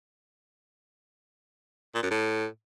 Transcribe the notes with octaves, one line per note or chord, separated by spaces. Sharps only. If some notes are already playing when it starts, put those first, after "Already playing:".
A#2
F#2
A2